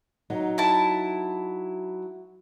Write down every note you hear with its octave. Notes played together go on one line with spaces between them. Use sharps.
F#3 D#4
E4 A5